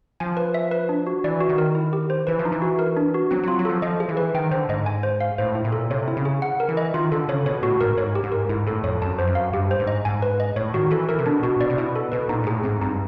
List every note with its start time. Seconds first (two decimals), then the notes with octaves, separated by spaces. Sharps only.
0.20 F3 G#5
0.37 B4
0.54 E5
0.71 B4
0.89 D4
1.07 F#4
1.24 E3 D5
1.40 F#4
1.49 D#3
1.58 A#4
1.75 E4
1.93 G4
2.10 C5
2.27 E3 B4
2.39 F3
2.45 D#4
2.52 E3
2.62 F#4
2.79 A#4
2.97 D4
3.14 F#4
3.31 F#3 C4
3.43 F#3 F4
3.59 F#3
3.65 F3 A4
3.82 F3 D#5
4.00 G#4
4.09 E3
4.17 B4
4.34 D#3 G5
4.51 D3 C5
4.69 G#2 D#5
4.86 G#5
5.03 C5
5.21 F5
5.38 A2 C5
5.55 E4
5.64 A#2
5.72 A4
5.90 C3 C#5
6.08 E4
6.17 C#3
6.25 G#4
6.42 F#5
6.60 A#4
6.68 E3
6.77 D#5
6.94 D#3 F4
7.12 D3 A4
7.28 C#3 C#5
7.46 B2 C#5
7.63 A2 F#4
7.81 G#2 A#4
7.97 G#2 C#5
8.15 G4
8.24 G#2
8.32 A#4
8.49 G#2 E4
8.67 A2 A4
8.83 F2 C#5
9.02 F#2 A5
9.19 F2 C5
9.27 F#2
9.35 F5
9.53 G2 G4
9.71 C5
9.79 G#2
9.87 D#5
10.05 G#2 G#5
10.22 B4
10.40 D#5
10.56 A2 C#5
10.74 D#3 F#4
10.91 E3 A4
11.09 E3 A#4
11.19 C3
11.26 B2 D4
11.43 B2 F#4
11.60 B2 D5
11.70 C3
11.78 B2 E4
11.96 A4
12.12 B2 B4
12.29 A#2 D#4
12.43 G#2
12.46 A2 G#4
12.63 G#2 C4
12.81 G2 D#4